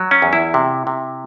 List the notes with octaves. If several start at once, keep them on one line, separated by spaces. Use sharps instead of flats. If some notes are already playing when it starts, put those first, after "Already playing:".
Already playing: F#3
C#4
E2
E4
C3
C3